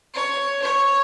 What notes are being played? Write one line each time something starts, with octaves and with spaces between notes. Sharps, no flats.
C#5
C#5